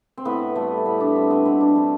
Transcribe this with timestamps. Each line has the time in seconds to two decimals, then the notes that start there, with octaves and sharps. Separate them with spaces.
0.17 C4
0.25 A2 B3
0.56 G3 A3
0.85 A2 B3
1.00 D4
1.15 G3 C4
1.31 B3
1.46 B2 C4
1.61 D4
1.75 A3 C4